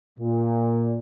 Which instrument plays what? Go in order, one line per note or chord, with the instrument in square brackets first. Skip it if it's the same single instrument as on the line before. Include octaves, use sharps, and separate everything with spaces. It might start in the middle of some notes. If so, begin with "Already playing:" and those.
[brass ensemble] A#2